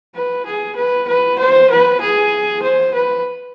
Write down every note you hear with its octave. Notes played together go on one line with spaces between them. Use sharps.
B4
G#4
B4
B4
C5
B4
G#4
C5
B4